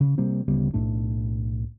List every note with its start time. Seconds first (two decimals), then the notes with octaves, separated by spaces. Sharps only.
0.01 C#3
0.18 C3 G3 A#3 C4
0.48 D1 C#3 G3 B3
0.74 B1 A2 A3 D4